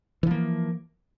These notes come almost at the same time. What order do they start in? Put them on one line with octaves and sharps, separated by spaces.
E3 F3 A#3